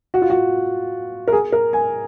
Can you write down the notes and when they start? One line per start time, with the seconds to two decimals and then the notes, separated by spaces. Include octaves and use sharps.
0.14 F#4
0.22 F4
0.30 F#4
1.27 A#4
1.32 G#4
1.52 A#4
1.73 G#5